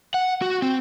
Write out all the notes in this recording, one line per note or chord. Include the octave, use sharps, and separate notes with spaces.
F#5
F#4
C4